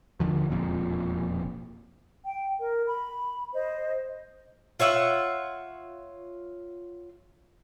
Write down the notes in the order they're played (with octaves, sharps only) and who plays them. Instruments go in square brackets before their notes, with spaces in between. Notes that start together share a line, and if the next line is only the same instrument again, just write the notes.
[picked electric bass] D#1 A#1 D3 F3
E1 F2 A#2
[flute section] G5
A#4
B5
C5 D#5
[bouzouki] F4 C#5 E5 F#5